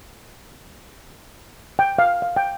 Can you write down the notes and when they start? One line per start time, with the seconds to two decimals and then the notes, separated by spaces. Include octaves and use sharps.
1.79 G5
1.99 F5
2.22 F5
2.36 G5